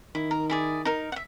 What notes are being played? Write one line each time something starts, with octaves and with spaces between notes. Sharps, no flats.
D#3 E4
A#4
E4 G#4 D5
D#4 A#4
E5 F#5